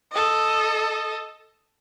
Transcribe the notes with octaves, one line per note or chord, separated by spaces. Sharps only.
A4 D#5